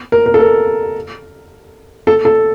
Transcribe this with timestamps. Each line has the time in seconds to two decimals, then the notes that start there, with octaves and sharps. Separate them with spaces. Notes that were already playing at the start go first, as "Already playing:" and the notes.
0.12 A#4
0.26 A#4
0.34 A4
0.40 A#4
2.07 A4
2.25 A4